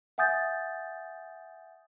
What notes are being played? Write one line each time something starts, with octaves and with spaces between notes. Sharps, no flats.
E5 F#5 G#5 D#6 G6 A6